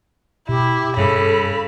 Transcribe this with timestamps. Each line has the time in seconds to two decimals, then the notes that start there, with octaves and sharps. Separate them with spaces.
0.49 B2 E4 G4
0.97 G2 C#3 G3 C#4 A4 B5